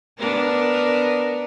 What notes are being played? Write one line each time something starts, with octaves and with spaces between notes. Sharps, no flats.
B3 D4 A#4